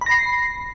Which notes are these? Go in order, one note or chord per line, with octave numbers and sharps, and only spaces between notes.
B5 A#6 C7